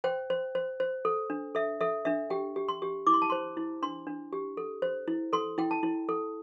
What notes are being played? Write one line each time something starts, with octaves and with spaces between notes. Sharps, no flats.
C5 G5
C5
C5
C5
A4
D4
A4 E5
A4 E5
D4 E5
G4 G5
G4
C6
G4
E4 D6
C6
A5
C5 C6
E4
D4 C6
D4
G4
A4
C5
E4
A4 C6
E4 G5
A5
E4
A4